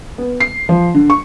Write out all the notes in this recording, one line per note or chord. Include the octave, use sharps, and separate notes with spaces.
B3
C7
F3
D3
C#6